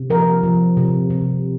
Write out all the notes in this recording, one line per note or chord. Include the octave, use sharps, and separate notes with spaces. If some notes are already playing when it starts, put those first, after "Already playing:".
Already playing: C3
F3 A#4
F3
C3
C3